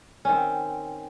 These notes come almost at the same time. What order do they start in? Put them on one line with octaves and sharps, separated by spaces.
C#4 D#3 C4